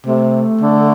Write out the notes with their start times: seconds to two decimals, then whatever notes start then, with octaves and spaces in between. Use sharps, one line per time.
0.06 C3 A3
0.61 D3